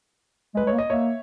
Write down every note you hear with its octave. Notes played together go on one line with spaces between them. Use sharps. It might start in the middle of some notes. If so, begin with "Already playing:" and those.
G#3
B4
G#3 C#5
A#3
D#5
A#3 C#5 E5